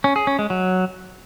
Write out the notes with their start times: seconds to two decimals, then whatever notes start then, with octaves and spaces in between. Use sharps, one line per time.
0.04 C#4
0.16 G#4
0.27 C#4
0.39 G#3
0.50 F#3